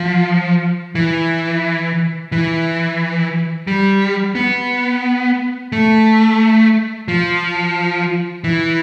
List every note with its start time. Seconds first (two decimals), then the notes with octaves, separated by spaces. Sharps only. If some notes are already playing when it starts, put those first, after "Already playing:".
Already playing: F3
0.95 E3
2.32 E3
3.67 G3
4.35 B3
5.72 A3
7.08 F3
8.44 E3